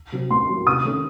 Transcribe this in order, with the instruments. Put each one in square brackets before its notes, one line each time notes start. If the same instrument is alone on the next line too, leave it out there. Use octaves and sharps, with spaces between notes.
[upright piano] C3 F#3 C4
[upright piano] A2 [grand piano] C6
[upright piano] F#3 A#3
[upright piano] C3 [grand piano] D#6
[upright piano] D#3 A3 C#4 A4